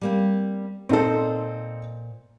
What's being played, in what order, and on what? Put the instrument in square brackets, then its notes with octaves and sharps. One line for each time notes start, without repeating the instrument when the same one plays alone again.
[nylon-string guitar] G3 A#3 C4
[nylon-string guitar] A#2 C5 [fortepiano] C4 D#4 A4